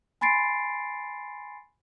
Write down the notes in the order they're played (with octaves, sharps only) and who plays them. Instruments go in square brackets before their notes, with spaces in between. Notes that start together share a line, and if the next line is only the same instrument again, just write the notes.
[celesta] G#5 B5 C6 A6 C7 D7